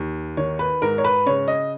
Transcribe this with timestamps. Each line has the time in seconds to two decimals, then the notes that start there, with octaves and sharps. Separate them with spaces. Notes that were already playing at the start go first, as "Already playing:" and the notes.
Already playing: D#2
0.37 D#3 C#5
0.59 B4
0.82 G#2 A#4
0.98 C#5
1.04 B4
1.26 C#3 C#5
1.48 D#5